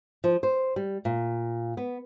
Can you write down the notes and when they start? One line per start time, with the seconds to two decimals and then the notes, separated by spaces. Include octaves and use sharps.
0.24 F3
0.43 C5
0.76 G3
1.05 A#2
1.77 B3